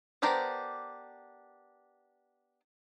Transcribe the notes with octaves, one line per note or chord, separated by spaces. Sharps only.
B3 D4 G4 A#4 C5